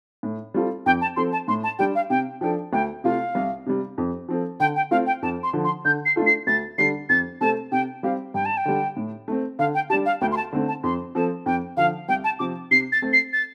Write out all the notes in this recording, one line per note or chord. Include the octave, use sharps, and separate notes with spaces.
A2
G3 C4 F4 A4
F2 G5
A5
F3 C4 A4 C6
A5
A2 C6
A5
G3 D4 G4 G5
F5
C3 G5
F3 D4 A4 G5
D2 G5
C3 A3 F4 F5
C2
C3 G3
F2
F3 C4 A4
D3 G5
G5
A3 C4 F4 F5
G5
F2 A5
C6
D3 F3
C6
D3 G6
C7
A3 D4 F4 A4
C7
D2 A6
D3 G3 D4 C7
F2 A6
C3 A3 C4 A4 A5
C3 G5
G3 C4 G4 F5
G2 G5
A5
G5
D3 G3
A2
A3 C4
D3 F5
G5
G3 D4 G4 A5
F5
D2 G5
C6
A5
D3 A3 C4
A5
F2 C6
F3 C4 A4 A5
F2 G5
D3 F3 F5
C2 G5
A5
C3 F3 C4 D6
C3 C7
A6
A3 C4
C7
A6